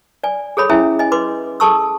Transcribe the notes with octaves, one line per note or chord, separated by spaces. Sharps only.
D5 G#5
G#4 A4 C#5 B5
C#4 E4 G#4 E5 G#5
D#5 G#5
B4 C6 D6
G#4 A4 A5 C#6 E6